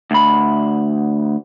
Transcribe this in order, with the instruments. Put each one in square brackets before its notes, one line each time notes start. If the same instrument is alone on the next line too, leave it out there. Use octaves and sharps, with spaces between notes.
[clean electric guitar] D2 B5